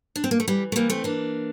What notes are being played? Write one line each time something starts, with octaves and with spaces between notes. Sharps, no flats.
D4
C4
A#3
A3
E3 G3
A3
E3 G3 A#3
A3 C4
E3 A#3 D4